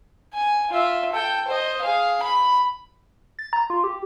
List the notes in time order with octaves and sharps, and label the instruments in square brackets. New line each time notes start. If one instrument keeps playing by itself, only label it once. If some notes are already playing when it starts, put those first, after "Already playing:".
[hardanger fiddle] G#5
F4 E5
A4 G5
C5 D#5
G#4 F5
B5
[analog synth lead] A6
A#5
F4
G4